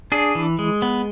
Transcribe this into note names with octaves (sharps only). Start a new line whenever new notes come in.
D4 G#4
E3
G#3
B3